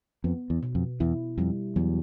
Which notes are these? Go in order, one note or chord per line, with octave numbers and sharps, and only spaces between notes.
F2 B3
E2
B2
F2
E2 E4
F2 G3
E2 F#3